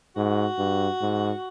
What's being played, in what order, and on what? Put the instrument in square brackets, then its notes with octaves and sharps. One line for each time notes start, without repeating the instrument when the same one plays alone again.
[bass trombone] G#2 [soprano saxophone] F#4
[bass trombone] G2
G#2